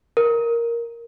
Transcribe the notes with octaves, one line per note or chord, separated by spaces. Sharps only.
A#4